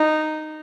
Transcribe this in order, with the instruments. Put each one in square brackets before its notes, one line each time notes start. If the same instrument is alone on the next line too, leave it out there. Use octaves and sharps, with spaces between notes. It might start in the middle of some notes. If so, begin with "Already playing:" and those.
Already playing: [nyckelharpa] D#4